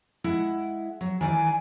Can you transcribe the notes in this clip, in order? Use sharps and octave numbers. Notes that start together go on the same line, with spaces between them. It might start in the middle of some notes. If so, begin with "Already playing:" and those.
G#3 E4 F#5
F#3
D#3 E3 D5 G#5